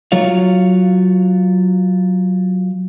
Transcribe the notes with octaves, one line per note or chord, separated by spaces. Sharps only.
F#3 F4 C#5 F5